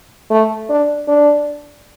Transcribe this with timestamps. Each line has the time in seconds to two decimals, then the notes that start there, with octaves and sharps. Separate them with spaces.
0.30 A3
0.69 D4
1.08 D4